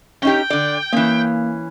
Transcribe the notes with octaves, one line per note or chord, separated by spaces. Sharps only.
C#4 D#4 G4 G5
D3 D5
E3 A#3 C#4